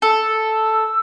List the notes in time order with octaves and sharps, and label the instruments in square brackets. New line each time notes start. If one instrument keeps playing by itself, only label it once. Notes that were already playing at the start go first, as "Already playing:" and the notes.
[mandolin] A4 [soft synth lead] E6